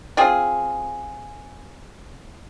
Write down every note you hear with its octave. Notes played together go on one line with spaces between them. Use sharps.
C4 F4 G#4